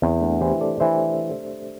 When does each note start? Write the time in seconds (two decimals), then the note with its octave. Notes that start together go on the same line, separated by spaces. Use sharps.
0.02 E2 C4
0.22 A3 D4
0.41 E3 G4 C5
0.61 A4 D5
0.80 E3 C5 E5